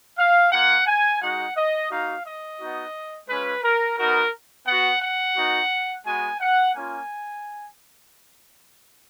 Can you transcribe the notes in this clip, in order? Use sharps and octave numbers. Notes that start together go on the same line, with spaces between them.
F5
A#3 F4 F#5
G#5
G#3 D#4 F#4 F#5
D#5
A#3 D#4 F#4 F5
D#5
B3 D#4 F#4
G#3 C#4 F4 B4
A#4
B3 D#4 F#4 A#4
B3 F#4 F#5
F#5
B3 D#4 F#4
G#3 B3 F#4 G#5
F#5
A#3 C#4 F4 G#5